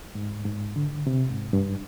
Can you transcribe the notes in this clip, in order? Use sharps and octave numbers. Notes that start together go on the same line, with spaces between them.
G#2
G#2
D3
C3
G#2
G2